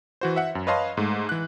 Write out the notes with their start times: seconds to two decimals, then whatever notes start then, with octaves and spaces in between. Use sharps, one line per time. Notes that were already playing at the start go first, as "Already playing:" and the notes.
0.21 E3 F#4 C5
0.36 E5 F#5
0.55 F#2
0.67 B4 C#5 D#5 F5 A5 C6
0.97 G#2 A3
1.29 E3 F#6